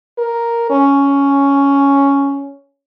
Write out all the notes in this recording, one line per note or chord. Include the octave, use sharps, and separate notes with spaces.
A#4
C#4